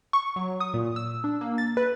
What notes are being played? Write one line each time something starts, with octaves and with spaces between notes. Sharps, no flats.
C#6
F#3
D#6
A#2
E6
D4
A#3
A6
B4